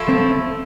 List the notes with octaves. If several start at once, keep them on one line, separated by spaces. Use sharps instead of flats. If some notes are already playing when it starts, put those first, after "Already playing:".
Already playing: F3 A3 E4
C4